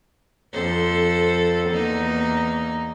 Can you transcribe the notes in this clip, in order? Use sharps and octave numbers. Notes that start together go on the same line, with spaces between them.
F2 A4 C5
E2 A#3 D#4